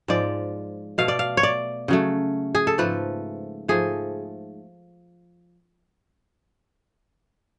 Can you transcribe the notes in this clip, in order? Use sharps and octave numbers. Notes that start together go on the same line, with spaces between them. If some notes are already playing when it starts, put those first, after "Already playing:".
G#2 F3 G#3 D5
B2 A3 F5
D5
F5
C#5
D5
C#3 F#3 A3
G#4
A4
G#2 F3 A3 B4
G#2 F3 A3 G#4